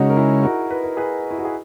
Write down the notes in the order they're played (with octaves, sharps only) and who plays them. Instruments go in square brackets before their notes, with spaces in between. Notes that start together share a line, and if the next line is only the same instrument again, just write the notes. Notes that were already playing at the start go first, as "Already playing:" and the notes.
Already playing: [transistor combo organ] C#3 G#3 C#4 [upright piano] D#4 F#4
[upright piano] A#4
E4 G#4
F#4 A#4
B4
A#4
G#4 B4
E4
F#4
G#4